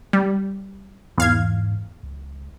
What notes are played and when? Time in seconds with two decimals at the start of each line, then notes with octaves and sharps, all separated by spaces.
0.13 G3
1.18 E2 G#2 F5 G#6
2.03 C#2